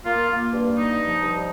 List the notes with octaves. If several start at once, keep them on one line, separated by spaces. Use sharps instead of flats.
A#3 F4
A#3
G2
D#4
F3
G2